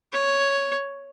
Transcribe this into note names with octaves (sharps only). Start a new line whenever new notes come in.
C#5